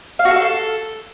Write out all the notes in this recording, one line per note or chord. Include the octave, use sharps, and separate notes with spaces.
F5
F#4
A4
F5
A4